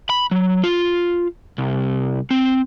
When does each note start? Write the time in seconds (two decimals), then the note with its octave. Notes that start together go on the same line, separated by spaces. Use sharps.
0.10 B5
0.31 F#3
0.64 F4
1.58 C2
2.31 C4